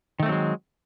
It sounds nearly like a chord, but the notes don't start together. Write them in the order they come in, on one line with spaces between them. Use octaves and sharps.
D#3 A3 C4 F#3 G#3